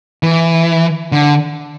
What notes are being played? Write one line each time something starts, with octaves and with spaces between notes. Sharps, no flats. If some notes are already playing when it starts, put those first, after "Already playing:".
E3
D3